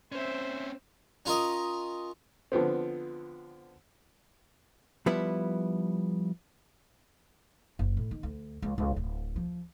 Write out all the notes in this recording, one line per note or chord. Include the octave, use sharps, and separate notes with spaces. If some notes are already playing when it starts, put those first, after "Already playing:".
C4 C#4 C5 E5
C#4 F4 A#4 D#5
D3 F3 B3 C4
F3 G3 B3 E4 B4
F#1
A2
D#3
D2
C#2
C#2
D1
F3